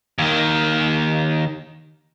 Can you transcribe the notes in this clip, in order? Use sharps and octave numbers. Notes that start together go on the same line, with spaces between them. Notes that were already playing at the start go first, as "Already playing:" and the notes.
D#2 D#3